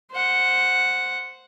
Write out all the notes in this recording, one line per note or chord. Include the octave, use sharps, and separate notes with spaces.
C5 F#5